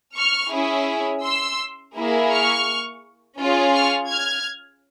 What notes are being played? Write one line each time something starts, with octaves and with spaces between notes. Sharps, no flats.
C#6 F6
C#4 E4 G#4
C6 E6
A#3 E4 G#4
C#6 F6
C#4 F4 G#4
C#6 F6
F6 G#6